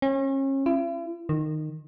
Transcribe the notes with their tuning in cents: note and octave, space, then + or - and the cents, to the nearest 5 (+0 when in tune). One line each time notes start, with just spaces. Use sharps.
C#4 -35
E4 +45
D#3 -15